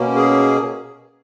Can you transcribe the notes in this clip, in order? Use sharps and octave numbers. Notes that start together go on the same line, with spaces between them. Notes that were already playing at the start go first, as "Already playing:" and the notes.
Already playing: B2 A#3 C#4
G#4